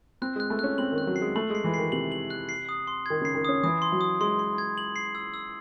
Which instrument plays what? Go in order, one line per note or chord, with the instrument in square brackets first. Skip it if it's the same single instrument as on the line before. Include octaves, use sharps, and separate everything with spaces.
[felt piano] C4 [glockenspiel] F#6
[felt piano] G#3 [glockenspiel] F#6
[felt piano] A3
[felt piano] C#4 [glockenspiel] F#6
[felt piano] C4 [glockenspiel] F#7
[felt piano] D#3
[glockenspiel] F#6
[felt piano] F#3
[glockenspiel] C7
[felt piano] G#3
[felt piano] A3 [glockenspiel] F#7
[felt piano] G#3 [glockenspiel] C7
[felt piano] E3
[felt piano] D#3 [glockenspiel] C7
[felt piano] C3 [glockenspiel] F#7
[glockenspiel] F#7
F#6
C7
D#6
C6
[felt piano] D#3 [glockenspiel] G#6
[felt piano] C#3 [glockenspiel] C7
[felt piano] D#3
[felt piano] C#4 [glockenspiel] D#6
[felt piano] E3 [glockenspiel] D#6
[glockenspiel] C6
[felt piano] F#3
[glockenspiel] D#6
[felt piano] G#3 [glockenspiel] C6
[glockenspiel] C6
G#6
F#7
C7
E6
E6